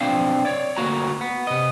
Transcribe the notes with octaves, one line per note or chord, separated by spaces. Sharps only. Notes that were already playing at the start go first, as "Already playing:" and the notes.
B1 C4 D4 F5
C#5 D5
D2 B2 A#3 F#4 A#5
B3
C3 D#5